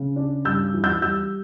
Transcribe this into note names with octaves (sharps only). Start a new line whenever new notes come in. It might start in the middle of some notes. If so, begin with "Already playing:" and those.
Already playing: C#3
D4
G2 E6 G6
E3
E6 G6
G3 E6 G6